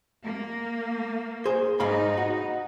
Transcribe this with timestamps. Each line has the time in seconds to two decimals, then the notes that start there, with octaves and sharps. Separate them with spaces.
0.22 A#3
1.45 G#4 C5
1.80 G#2 D#4 F5 B5
2.18 F#4